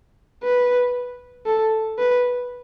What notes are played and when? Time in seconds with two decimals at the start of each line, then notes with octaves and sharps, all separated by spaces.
0.44 B4
1.46 A4
1.99 B4